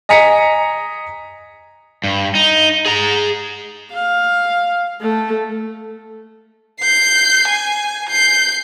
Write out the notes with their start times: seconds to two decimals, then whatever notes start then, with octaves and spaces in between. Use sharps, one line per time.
0.09 D#5 G#5 A#5 B6 C#7
2.04 G2
2.35 D#4
2.86 G#4 A#5
3.93 F5
5.01 A3
6.80 G6 C7
7.48 G#5
8.09 G6 C7